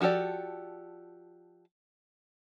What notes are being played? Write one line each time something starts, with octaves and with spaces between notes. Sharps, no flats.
F3 F#4 G4 A4 D5